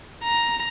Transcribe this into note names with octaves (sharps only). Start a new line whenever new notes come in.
A#5